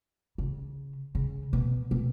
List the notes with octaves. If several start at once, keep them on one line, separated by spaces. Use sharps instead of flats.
C#3
C#3
B2
B2